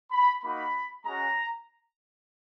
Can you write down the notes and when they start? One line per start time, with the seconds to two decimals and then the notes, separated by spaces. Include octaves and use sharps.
0.11 B5
0.42 A#3 D#4 F#4 B5
1.04 G#3 C#4 F#4 A#5